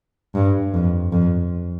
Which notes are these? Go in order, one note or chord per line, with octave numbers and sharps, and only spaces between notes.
G2
F2
F2